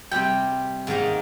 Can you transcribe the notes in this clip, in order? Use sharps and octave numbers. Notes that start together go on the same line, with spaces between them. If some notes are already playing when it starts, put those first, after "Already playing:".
C3 G3 C4 G4 G5
G#2 D#3 A#3 D#4